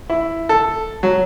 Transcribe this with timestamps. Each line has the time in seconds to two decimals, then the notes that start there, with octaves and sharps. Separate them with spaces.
0.10 E4
0.49 A4
1.03 F#3